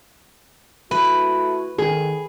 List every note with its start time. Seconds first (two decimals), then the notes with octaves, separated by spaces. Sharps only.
0.91 A3 E4 F#4 B4
1.78 D#3 G#4